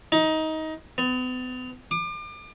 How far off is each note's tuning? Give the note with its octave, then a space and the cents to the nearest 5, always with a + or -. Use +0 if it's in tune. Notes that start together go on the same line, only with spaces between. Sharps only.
D#4 +20
B3 +40
D6 +35